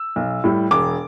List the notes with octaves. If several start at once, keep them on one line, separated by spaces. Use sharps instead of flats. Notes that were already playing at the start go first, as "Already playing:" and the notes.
Already playing: E6
B1
A2 G3
E1 D6